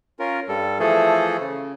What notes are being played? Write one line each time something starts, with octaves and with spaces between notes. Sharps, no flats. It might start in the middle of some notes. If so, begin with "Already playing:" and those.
C#4 F4 A#4
G2 G3 A4
E3 F3 A3 G#4 A4
C#3